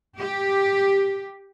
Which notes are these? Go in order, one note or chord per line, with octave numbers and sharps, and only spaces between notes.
G4